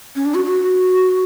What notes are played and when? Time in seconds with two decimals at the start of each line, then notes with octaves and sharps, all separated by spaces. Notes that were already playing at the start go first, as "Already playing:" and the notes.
0.16 C#4
0.26 D4
0.35 F#4
0.45 F#4